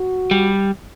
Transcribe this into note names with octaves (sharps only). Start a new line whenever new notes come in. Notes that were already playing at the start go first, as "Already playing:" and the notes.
Already playing: F#4
G3